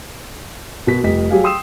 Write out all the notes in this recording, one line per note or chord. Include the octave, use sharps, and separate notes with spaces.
B2 A#4 B6
F1 G3 D#5 B6
F#3 G4 G#4 F5
G5 C6 D#6 E6 C7 E7